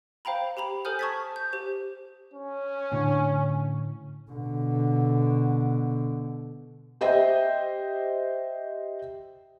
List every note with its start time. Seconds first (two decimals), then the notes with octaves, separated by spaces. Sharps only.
0.25 C5 F5 G5 A#5 B5
0.57 G4 A#5 B5 F7
0.85 A4 C5 G#5 D#6 F6 G6
0.99 A5 C#6 D#6 G#6 A6 B6
1.36 G6
1.53 G4 C5
2.34 C#4
2.92 A2 D3
4.32 B2 D3
7.01 G4 C5 D#5 E5 G5